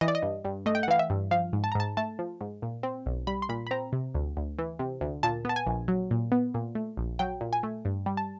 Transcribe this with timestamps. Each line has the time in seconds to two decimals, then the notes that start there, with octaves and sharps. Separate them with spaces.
0.01 E3 D#5
0.08 D5
0.15 D#5
0.23 G2
0.45 G2
0.66 A3 D#5
0.75 G5
0.83 F#5
0.88 E3 F5
0.99 E5
1.10 G2
1.31 F3 F5
1.53 G#2
1.64 A5
1.72 A#5
1.75 G#2 A5
1.97 A3 A5
2.19 F3
2.41 G#2
2.62 A#2
2.83 C4
3.06 B1
3.27 G3 B5
3.42 C6
3.49 A#2 B5
3.67 B5
3.71 C4 A#5
3.93 C3
4.14 D2
4.37 D2
4.59 E3
4.79 C3
5.01 D2
5.23 A#2 A5
5.45 B3 A5
5.56 G#5
5.66 A#1
5.88 F#3
6.11 A#2
6.32 B3
6.54 A#2
6.75 A3
6.97 A#1
7.19 F#3 G5
7.41 A#2
7.53 G#5
7.63 A3
7.85 G2
8.06 G3
8.17 A5